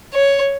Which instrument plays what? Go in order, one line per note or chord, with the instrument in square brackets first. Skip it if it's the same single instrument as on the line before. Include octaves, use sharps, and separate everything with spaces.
[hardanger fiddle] C#5